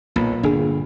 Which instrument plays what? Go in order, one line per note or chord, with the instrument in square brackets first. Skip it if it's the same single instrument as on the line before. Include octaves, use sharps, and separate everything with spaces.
[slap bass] B1 [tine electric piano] A#2 A#3 B5
[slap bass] G1 [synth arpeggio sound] D4 G#4